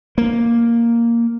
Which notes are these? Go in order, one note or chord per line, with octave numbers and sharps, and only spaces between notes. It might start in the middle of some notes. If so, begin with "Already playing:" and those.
A#3